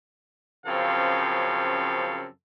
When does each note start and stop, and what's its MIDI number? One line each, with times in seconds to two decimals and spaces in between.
0.66 2.26 42
0.66 2.26 49
0.66 2.26 53
0.66 2.26 60
0.66 2.26 69
0.66 2.26 77